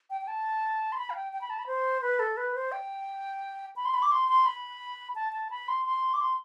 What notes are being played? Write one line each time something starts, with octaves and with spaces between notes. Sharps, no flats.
G5
G5
A5
C6
B5
F5
G5
G5
B5
A5
B5
C5
B4
A4
B4
C5
G5
B5
C6
B5
D6
C6
C6
B5
A5
A5
B5
C6
C6
D6
C6